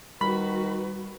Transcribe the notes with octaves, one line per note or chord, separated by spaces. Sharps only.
D#3 G3 F#4 B4 B5